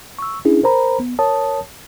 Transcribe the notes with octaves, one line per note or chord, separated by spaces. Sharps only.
C#6 E6
C#4 D4 E4 G#4
A#4 C5 A#5 B5
B3
A#4 C#5 A5 D#6